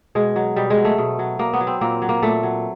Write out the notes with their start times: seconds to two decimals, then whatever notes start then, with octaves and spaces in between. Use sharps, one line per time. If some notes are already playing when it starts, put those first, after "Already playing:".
0.15 B2 G#3
0.36 F#3
0.56 B2 G3
0.70 G#3
0.78 F#3
0.85 A3
0.98 B2
1.19 F#3
1.39 B2 A#3
1.53 B3
1.61 F#3
1.67 C4
1.81 A#2 A#3
2.02 F#3
2.09 A#3
2.22 A#2 A3
2.43 F#3